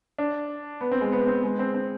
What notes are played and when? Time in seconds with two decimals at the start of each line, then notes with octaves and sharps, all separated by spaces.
0.18 D4
0.81 B3
0.91 C4
1.01 G#3
1.12 B3
1.27 C4
1.44 G#3
1.59 C4
1.74 C4